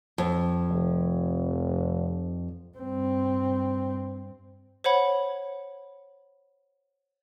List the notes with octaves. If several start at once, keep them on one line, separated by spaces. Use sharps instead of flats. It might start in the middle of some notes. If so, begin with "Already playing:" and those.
F2
F1
G2 C4
C5 C#5 F#5 B5 G#6